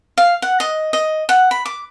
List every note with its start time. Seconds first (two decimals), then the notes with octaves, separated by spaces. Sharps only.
0.18 F5
0.42 F#5
0.60 D#5
0.93 D#5
1.29 F#5
1.51 B5
1.66 D6